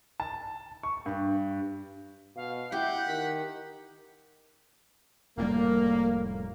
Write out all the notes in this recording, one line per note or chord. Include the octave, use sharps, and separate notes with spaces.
A5
C#6
G2
B2 F5
E4 G4 F#5 G6
D#3 B6
F1 A2 G3 A#3